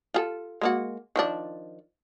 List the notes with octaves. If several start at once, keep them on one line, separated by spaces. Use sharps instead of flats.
F4 G#4 A4
G#3 A#3 F#4
D#3 F3 D4